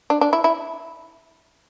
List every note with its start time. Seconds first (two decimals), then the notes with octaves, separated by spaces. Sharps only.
0.10 D4
0.21 D4
0.33 E4
0.44 E4